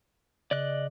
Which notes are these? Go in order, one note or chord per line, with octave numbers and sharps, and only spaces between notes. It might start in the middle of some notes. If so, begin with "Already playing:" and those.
C#3 D5 D#5 F#6